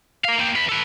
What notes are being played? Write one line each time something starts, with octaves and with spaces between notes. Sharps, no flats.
A#4 F5
A#3 G4
E2 B4
A4 B4